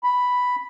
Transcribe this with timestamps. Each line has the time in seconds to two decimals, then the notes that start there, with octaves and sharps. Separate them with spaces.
0.04 B5